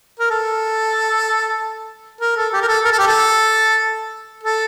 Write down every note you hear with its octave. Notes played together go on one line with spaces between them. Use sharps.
A#4
A4
A#4
A4
G4
A#4
A4
A#4
A4
G4
A4
A4